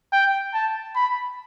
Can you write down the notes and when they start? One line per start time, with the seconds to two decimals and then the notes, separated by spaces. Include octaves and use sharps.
0.13 G5
0.54 A5
0.95 B5